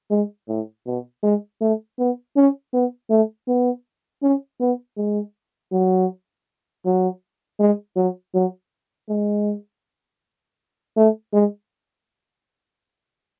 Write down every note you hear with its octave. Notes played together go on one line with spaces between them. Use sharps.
G#3
A2
B2
G#3
A3
B3
C#4
B3
A3
B3
C#4
B3
G#3
F#3
F#3
G#3
F#3
F#3
G#3
A3
G#3